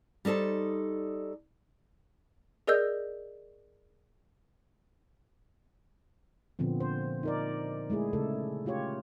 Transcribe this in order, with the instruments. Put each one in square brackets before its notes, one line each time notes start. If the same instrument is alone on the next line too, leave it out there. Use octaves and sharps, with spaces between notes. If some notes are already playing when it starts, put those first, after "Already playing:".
[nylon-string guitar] G3 D#4 A4 C5 A5
[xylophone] G#4 A#4 D5 D#5 E6 G6
[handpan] A#2 D3 F3 B3 C4
C5
D#4 A#4 D5
G#3 A3 E4 G#4
C#3 A3 A4
A3 F4 G4 C#5